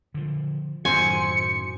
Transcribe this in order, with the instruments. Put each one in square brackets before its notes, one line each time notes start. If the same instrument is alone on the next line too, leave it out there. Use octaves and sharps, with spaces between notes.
[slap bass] D3 F3
[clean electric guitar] F#2 C5 [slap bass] A2 D#3 [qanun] G#5 [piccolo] C#7